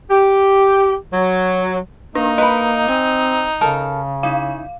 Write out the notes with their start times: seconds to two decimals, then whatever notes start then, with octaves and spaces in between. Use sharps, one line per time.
0.11 G4
1.13 F#3
2.15 A#3 D4 D#4
2.38 B4 D#5 B5
2.88 C4 G#5
3.61 C#3 A4 A#4 A5
4.23 D#4 E4 F5